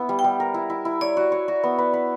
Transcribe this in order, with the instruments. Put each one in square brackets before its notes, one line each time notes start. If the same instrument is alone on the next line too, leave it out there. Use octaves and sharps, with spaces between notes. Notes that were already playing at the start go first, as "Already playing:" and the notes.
Already playing: [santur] B3 E4
G3
[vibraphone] G5
[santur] G3
A#4
E4
E4
E4
[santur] C#5 [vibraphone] D5
[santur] F#4
C#5
F#4
B3
B4
B4